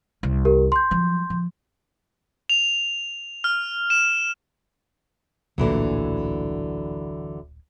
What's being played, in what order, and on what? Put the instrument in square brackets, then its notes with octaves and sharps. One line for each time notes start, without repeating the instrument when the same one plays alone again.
[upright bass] C2
[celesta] G4 A#4
C6 G6
[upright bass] F3 F#3
F3
[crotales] F7
F6
E7
[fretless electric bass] D1 A#1 A#2 [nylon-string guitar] D3 E3 F#3